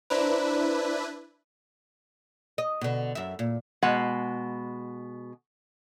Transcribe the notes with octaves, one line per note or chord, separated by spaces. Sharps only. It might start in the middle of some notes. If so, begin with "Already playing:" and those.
D4 E4 B4 C5 D5 A#5
D#5
B2 D3
F#2 E5
A#2
B2 G#3 F#5